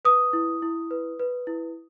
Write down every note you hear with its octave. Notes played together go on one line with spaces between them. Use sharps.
B4 D#6
E4
E4
B4
B4
E4